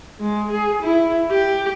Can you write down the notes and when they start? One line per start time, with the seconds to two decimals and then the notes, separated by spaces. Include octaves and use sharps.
0.20 G#3
0.51 G#4
0.83 E4
1.31 G4